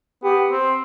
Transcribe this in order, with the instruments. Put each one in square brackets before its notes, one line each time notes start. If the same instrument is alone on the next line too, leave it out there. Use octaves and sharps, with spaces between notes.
[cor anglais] B3 [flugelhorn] G4
[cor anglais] C4